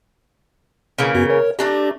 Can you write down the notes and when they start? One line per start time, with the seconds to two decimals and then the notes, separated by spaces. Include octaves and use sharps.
0.98 C#3 E3 A#3
1.15 F#2 B3 F#4
1.29 A#4 C#5
1.59 A3 D4 G4 A#5